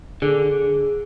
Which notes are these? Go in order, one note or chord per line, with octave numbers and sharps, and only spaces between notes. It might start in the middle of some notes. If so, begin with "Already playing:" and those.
D3 G#4